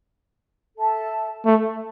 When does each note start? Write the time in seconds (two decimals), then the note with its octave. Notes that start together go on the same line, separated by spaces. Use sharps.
0.77 A4 E5 A5
1.45 A3